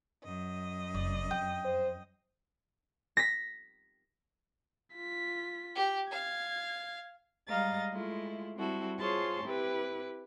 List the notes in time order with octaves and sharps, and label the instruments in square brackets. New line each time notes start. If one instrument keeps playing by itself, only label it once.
[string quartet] F#2 D#5
[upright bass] F1 [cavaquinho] D5
[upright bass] F2 [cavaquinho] G5
[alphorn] C5
[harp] A#6 B6
[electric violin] F4 B6
[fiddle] G4
[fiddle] F5 [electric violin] G#6
[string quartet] G3 G#3 D#5 F5 A#5 A6
G#3 A3 E4 F4
G3 C4 E4 F#4 A4
F4 G#4 C5 C#5 A5 C6
C4 E4 G4 B4